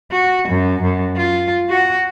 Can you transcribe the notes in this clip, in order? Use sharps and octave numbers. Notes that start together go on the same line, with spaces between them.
F#4
F#2
F#2
F4
F#4